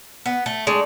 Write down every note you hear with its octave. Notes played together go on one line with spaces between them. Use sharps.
B3
A3
G#3 A3 D4 A4 D5